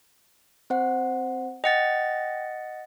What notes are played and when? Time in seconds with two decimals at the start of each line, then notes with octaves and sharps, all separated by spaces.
0.70 C4 C5 F#5
1.64 D#5 F#5 G5 A6